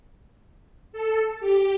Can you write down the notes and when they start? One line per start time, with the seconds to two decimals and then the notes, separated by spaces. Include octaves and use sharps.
0.92 A4
1.40 G4